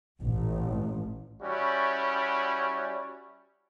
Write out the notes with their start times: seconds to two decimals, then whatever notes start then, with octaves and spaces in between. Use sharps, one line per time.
0.21 A1
1.42 G3 C#4 E4 F#4